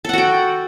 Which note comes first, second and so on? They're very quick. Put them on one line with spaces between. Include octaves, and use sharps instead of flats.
A4 F#5 F#4 G5